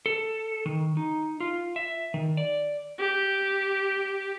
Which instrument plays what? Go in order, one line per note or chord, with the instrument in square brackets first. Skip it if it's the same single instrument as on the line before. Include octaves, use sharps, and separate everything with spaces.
[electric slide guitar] A4
D#3
D#4
F4
E5
D#3
D5
[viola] G4